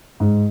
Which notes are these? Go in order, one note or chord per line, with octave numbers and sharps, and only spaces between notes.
G#2